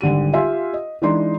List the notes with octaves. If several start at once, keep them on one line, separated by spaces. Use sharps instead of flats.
G#1 D3 G3 D#7
F4 G4 E5 F5 G#5 C6
D#5
E3 G#3 D4 D#4 C6